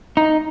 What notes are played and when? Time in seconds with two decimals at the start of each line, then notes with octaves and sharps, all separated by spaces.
0.17 D#4